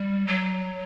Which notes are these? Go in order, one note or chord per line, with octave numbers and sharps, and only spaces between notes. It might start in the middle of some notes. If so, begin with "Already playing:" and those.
Already playing: G3
F#3